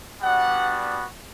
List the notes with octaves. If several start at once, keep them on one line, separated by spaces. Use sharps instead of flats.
G3 B3 D4 F#4 F#5